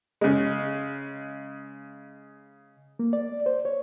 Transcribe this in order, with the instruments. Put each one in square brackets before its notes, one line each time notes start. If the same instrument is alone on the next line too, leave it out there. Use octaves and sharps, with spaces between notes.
[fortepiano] C#3 G#3
[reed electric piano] A#3
D5
C5
C#5